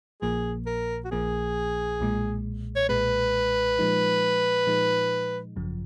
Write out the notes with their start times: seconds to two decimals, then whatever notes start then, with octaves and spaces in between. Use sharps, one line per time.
0.22 A#1 A#2 F3 A#3 G#4
0.66 A#4
1.05 F#4
1.11 A#1 A#2 F3 A#3 G#4
2.00 B1 A#2 G#3
2.76 C#5
2.89 B1 A#2 G#3 B4
3.79 A#2 F3 G#3 D#4
4.67 A#2 F3 G#3 D#4
5.56 G#1 F#2 C#3 F3